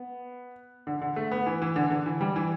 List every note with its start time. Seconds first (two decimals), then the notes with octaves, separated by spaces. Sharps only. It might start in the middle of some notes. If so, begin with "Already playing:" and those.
Already playing: B3
0.87 D3
1.02 D3
1.16 A3
1.32 B3
1.46 E3
1.62 E3
1.76 D3
1.91 D3
2.06 E3
2.21 G3
2.36 E3